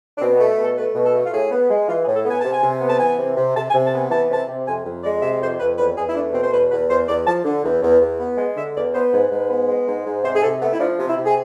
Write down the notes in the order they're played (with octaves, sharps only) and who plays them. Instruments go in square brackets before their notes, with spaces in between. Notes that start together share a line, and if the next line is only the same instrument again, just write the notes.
[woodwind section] D4
B2 C4
B3
A3
B2
A4
A3 B4
B2
A4
A3
F4
A2 G#4
B3
G#3
E3 F4
G#4
A2
A4
B3 G#5
C3 A5
G#5
C3
B3
A5
E3 G#5
C3
C3
C3 A5
G#5
C3
A5
B3 G#5
E3 A5
C3 A5
C3
F2 G#5
F2
G#3 D5
C3 E5
F2 C5
F2 B4
E2 B4
E2 G#4
E4
A3 D4
B2 C4
C5
E2 B4
E2 B4
E2 C5
E2 D5
F3 A5
D3
E2
E2
E2
B3
G#3
D3 E5
E2 D5
B3 C5
G#2 B4
G#2
B3
G#3
G#2
G#2
C3 C5
G#4
C3 A4
A3 B3
E4
F3 D4
C3
E4
C3
G#4